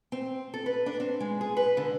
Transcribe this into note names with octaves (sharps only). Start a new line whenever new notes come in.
C4
A4
B4
D4
C4
G#3
G#4
B4
D3